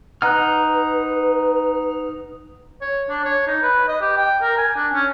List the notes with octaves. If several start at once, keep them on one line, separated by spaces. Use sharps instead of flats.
D#4 B4 F#5 A#5 F6 F#6
C#5
D4
C#5
D#4
B4
D#5
G4
G5
A#4
G#5
D4
C#4